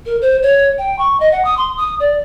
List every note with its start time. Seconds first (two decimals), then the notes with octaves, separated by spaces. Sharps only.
0.06 A#4
0.21 C5
0.42 C#5
0.78 G5
0.99 C#6
1.20 D#5
1.32 F#5
1.45 D#6
1.57 C6
1.77 D#6
2.00 D5